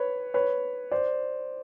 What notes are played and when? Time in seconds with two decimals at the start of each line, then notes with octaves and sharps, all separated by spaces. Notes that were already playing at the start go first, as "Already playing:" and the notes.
Already playing: B4 C#5
0.34 B4 C#5
0.91 C5 D5